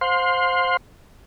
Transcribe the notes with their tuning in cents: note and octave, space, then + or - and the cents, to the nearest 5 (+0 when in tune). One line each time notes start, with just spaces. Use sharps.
C5 +0 F5 +40 C6 +0